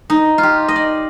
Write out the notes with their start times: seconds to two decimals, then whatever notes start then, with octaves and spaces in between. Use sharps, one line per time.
0.10 D#4
0.38 F4
0.43 G4
0.68 D#5
0.76 D5